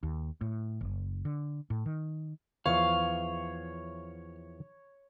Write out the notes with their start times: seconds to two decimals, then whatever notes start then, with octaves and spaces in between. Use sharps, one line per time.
0.03 D#2
0.41 A2
0.81 F#1
1.25 D3
1.70 A2
1.86 D#3
2.66 E2 E3 F3 C#5 F5